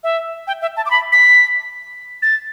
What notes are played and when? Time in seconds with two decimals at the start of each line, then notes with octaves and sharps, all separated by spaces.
0.03 E5
0.47 G5
0.62 E5
0.77 A5
0.86 D6
0.91 B5
1.12 B6
2.22 A6